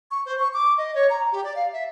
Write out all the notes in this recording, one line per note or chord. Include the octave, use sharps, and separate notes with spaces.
C#6
C5
C#6
D6
D#5
C#5
A#5
G4
D5
F5
E5